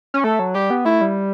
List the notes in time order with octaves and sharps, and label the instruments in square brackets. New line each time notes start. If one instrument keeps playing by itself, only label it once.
[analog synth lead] C#4
[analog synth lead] A3 [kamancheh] A4
[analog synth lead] F#3
[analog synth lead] G3 [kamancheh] G4
[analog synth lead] B3
[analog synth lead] A3 [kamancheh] E4
[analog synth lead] G3